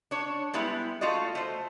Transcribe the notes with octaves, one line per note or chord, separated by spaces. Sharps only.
D4 C#5
G3 G#3 B3 E4
A3 F4 F#4 D5 D#5
A3 C5